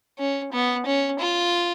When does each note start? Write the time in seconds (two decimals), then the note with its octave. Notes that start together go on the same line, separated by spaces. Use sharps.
0.18 C#4
0.53 B3
0.86 C#4
1.19 F4